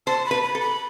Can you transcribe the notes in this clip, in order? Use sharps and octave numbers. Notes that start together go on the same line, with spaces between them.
C5 A5
B5
B4
B5
A4
B5